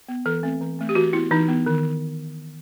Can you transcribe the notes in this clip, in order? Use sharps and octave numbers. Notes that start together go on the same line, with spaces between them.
B3
E3 A4
A3 C4
E3
A3 C4
G4
E3 F#4
B3 E4
E3 D#4
B3
D#3